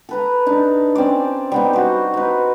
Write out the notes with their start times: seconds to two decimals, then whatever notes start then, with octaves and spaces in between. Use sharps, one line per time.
0.09 A4 B4 A#5
0.46 D4 D#4
0.95 C4 C#4 D5
1.52 G3 B3 D#4
1.73 F#4 C5
2.14 D#4 B4